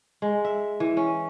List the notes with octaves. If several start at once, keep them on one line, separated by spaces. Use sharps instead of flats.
G#3
E5
E3
C#4